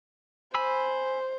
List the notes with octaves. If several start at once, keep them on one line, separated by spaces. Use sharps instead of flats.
C5 G#5 B5 E6